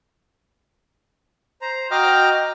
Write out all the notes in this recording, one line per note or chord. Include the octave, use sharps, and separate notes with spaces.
C5 A#5
F#4 D#5 G5 A#5 D6 F6